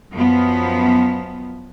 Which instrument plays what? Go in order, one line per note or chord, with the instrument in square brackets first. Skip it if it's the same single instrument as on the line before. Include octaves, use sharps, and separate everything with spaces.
[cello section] F#2 F3 B3